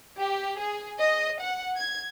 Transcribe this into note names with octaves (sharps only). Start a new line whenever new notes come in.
G4
G#4
D#5
F#5
G#6